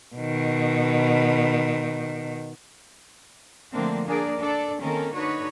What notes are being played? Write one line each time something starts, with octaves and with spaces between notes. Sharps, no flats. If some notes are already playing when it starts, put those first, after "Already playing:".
B2 D#3
D3 F3 A3 A#3 C4 D4
A#3 D4 G#4 A#4 D5
D4 A4 D5
D#3 A#3 C4 C#4 A4 A#4
D3 D#4 F#4 B4 C#5